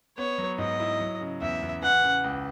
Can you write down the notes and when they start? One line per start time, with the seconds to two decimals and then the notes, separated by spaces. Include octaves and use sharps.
0.17 B3 C#5
0.38 F#3
0.58 G#2 D#5
0.80 E4
1.00 F#3
1.21 C#3
1.42 E2 E5
1.62 E2
1.82 E3 F#5
2.04 C#3
2.24 C#2